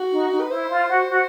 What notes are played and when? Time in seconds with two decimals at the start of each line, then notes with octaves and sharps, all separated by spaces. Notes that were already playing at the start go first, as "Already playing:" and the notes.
Already playing: F#4
0.12 D#4
0.31 D#4
0.41 B4
0.50 E4 C5
0.69 F4
0.88 F#4
1.08 F#4